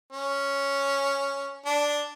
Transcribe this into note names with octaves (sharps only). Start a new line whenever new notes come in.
C#4
D4